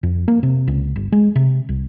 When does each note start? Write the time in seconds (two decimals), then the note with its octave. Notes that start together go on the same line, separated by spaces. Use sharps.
0.03 F2
0.28 A#3
0.43 C3
0.67 C#2
0.96 G1
1.12 G#3
1.36 C3
1.69 C2